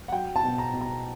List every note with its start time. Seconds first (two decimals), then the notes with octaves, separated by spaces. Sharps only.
0.08 F#5
0.12 F#3 G5
0.36 A5
0.43 B2
0.58 A#5
0.74 B2
0.81 A#5